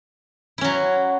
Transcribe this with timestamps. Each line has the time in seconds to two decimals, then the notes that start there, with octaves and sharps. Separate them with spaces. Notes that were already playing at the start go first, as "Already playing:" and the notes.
0.58 E4
0.61 C#4
0.64 F#3